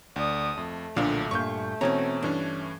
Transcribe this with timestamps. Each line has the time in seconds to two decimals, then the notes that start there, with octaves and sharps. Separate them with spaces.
0.16 D2 D5 D#6
0.57 F2 A3
0.96 B1 A#2 D3 F3 D4
1.31 G2 A#2 C#6 G6
1.81 B2 E3 C4 C#4 A#5
2.23 G2 E3 C#4 D4